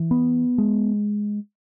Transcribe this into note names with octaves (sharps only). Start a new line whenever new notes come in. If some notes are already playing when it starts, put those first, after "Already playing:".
Already playing: E3
B3
G#3